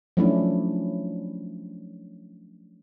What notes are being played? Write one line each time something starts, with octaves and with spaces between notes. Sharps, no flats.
F3 F#3 A3 C#4 D4 E4